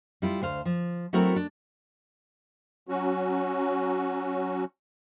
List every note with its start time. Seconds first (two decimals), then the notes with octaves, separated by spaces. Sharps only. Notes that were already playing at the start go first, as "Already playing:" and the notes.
0.22 G3 E4 F4
0.42 D2 C5 F5
0.65 F3
1.13 F#3 A3 C4 E4 F#4 A#4
1.36 D4
2.89 F#3 C#4 F#4